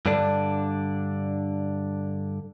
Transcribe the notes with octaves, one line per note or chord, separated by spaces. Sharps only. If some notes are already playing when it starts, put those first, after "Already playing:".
G2 D3 D4